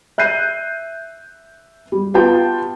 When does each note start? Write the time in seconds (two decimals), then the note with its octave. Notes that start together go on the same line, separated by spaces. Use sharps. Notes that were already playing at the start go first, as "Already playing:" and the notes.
0.18 E5 F#6 G6 C7 D#7
1.92 G3
2.14 B3 F4 G4 G5 A5